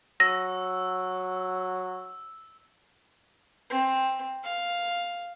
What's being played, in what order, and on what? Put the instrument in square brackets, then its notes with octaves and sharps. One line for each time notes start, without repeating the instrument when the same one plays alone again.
[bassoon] F#3 [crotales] E6 [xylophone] A#6
[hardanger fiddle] C4
F5